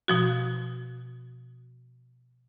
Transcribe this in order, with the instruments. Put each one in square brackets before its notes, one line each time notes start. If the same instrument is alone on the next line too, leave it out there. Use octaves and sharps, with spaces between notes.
[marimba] B2 F3 F#4